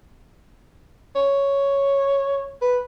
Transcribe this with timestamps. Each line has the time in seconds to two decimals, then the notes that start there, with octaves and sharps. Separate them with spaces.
1.15 C#5
2.62 B4